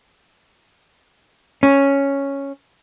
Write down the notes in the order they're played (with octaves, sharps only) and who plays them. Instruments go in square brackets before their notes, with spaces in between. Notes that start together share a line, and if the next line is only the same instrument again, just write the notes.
[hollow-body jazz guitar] C#4